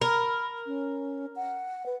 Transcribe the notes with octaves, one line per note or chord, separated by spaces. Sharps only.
A#4 B5
C#4
F#5
B4